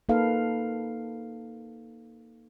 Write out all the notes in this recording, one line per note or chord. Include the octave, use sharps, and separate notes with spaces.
A#3 D#4 A4 B4 F5